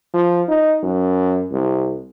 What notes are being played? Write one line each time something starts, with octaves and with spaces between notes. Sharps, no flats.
F3
D#4
F#2
C2